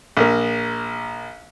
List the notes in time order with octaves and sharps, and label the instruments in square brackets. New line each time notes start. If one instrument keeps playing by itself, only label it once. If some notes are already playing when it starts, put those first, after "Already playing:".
[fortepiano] A#1 A#3